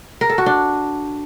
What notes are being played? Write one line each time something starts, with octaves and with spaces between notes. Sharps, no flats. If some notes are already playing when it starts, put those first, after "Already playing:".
A#4
A4
F#4
D4